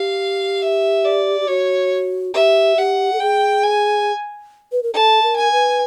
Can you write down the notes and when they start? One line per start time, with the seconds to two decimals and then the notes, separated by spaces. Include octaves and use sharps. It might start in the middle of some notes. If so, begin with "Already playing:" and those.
Already playing: G4 F5
0.62 E5
1.05 D5
1.41 G4
1.48 F#4 C#5
2.34 G4 E5
2.77 G4 F#5
3.13 A4
3.20 G#4 G5
3.64 G#5
4.72 B4
4.83 A#4
4.94 A4 A5
5.23 A#4
5.36 G#5
5.52 B4